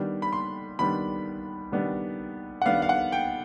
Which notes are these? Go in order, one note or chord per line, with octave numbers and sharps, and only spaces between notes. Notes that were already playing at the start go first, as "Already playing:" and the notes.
Already playing: D#3 G3 B3 D4
B5
C6
D#3 G3 B3 D4 B5
D#3 G3 B3 D4
F#5
D#3 G3 B3 D4 F5
F5
F#5
G5